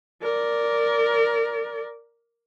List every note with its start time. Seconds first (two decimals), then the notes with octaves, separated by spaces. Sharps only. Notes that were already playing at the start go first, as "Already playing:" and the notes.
0.23 A#4 D5